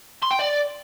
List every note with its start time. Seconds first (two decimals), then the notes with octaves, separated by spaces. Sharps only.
0.22 C6
0.31 G5
0.39 D5